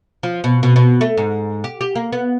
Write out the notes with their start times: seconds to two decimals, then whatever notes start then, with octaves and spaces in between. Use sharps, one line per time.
0.23 F3
0.44 B2
0.63 B2
0.76 B2
1.01 A3
1.17 G#2
1.64 G4
1.81 G4
1.95 A#3
2.12 B3